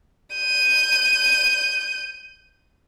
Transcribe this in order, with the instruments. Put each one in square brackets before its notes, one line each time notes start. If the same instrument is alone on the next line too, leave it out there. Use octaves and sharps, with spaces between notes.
[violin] G6 D#7